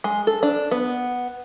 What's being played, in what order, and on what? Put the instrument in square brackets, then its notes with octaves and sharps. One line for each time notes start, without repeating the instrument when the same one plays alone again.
[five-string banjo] G#3
A4
D4
B3